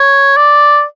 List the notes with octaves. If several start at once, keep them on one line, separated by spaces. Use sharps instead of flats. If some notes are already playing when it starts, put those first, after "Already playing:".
Already playing: C#5
D5